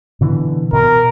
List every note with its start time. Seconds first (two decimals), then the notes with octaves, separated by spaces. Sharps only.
0.21 B2 D3 E3
0.73 B2 A#4